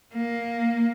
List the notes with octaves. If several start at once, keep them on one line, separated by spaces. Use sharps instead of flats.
A#3